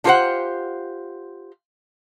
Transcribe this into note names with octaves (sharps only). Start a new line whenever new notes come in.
D4 F4 G4 A4 C5 F#5